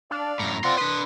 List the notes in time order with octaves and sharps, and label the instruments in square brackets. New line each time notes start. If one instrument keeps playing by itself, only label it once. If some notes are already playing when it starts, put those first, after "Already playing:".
[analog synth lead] D4 [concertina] D5 F5
[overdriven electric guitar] F#2 A2 [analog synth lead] A#5
[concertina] C4 F4 F#5 [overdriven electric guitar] D5 C6
[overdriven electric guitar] D4 C6 [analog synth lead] B4 [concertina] D#6